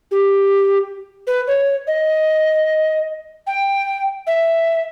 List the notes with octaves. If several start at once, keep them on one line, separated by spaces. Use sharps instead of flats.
G4
B4
C#5
D#5
G5
E5